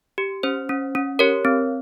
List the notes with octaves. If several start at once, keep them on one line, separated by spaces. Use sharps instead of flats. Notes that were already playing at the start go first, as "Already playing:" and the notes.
G4
C#4 C5
C#4
C#4
G4 A#4 C#5
C4